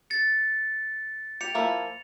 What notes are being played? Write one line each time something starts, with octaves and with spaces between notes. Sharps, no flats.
A6 C#7
G4 C#7 F7
F3 A#3 E4